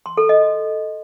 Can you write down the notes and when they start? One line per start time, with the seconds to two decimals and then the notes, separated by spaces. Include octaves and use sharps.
0.06 C6
0.17 A4
0.29 D#5